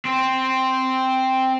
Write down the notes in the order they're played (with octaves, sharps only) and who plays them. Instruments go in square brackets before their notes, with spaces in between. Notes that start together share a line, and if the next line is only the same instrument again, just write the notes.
[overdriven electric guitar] C4